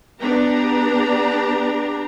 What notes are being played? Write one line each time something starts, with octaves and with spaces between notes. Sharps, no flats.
B3 D4 G4 A#5